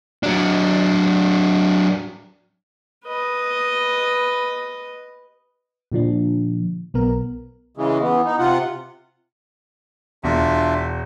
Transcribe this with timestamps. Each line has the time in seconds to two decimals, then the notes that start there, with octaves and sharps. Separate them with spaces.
0.23 F#3 D4
3.05 B4 D#5
5.92 A#2 D3 F3 D4
6.94 B1 B3 A#4
7.77 C#3 E3 G#3
8.01 E3 B3
8.25 D#4
8.39 C3 F4 F#5
10.24 E1 D4 F4 E5